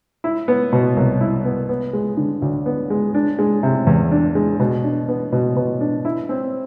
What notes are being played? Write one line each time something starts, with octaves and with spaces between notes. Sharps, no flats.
E4
B3
B2
C2
E4
B3
B3
G#3
D3
D2
B3
G#3
D4
G#3
C3
E2
D4
G#3
B2
D4
B3
B2
B2
D4
E4
C4